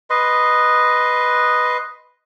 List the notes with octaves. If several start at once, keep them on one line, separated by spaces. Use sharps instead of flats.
B4 D#5 C6